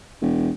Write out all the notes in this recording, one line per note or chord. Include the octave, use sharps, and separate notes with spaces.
E1